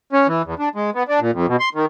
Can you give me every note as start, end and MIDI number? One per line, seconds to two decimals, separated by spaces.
0.13 0.27 61
0.27 0.42 52
0.45 0.55 40
0.59 0.69 62
0.75 0.90 56
0.95 1.03 59
1.08 1.20 62
1.20 1.31 46
1.33 1.46 41
1.47 1.56 47
1.60 1.69 84
1.74 1.86 51